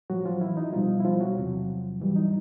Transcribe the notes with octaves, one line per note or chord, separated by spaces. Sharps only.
A2 F3 F#3 F#4
F3 F4
E3 E4
D#4
B2 F3 G3 F4
E4
F3 F4
F#3 F#4
E2 C3 F3
G#2 E3 G3
D#4